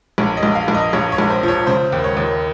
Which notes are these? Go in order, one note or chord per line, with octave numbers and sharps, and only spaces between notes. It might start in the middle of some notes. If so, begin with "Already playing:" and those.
A#1 C#5
D#5
A#1
F5
A#1
D#5
A#1 C#5
C#5
A#1
C5
F3 C#5
C#3 C5
D#2
C#5
D#2